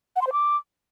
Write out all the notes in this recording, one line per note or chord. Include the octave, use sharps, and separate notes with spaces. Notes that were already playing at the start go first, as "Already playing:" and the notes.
F#5
C6
C5
D6